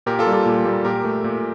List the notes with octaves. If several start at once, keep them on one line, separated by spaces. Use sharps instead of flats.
A#2 G4 A#4
F4 A4
G3 A#3
F4 A4
A#2
G3 A#3
A#2 G4 A#4
A3
A#2